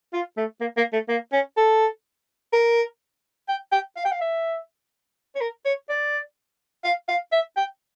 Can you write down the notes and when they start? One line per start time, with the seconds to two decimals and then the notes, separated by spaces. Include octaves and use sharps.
0.13 F4
0.37 A3
0.61 A#3
0.77 A#3
0.93 A3
1.09 A#3
1.33 C#4
1.57 A4
2.53 A#4
3.49 G5
3.72 G5
3.97 F5
4.05 G5
4.12 F5
4.21 E5
5.35 C#5
5.41 A#4
5.65 C#5
5.89 D5
6.84 F5
7.09 F5
7.32 E5
7.57 G5